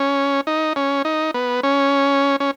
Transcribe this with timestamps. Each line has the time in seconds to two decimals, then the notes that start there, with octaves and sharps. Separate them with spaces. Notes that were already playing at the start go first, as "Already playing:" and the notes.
Already playing: C#4
0.47 D#4
0.76 C#4
1.05 D#4
1.34 B3
1.63 C#4
2.40 C#4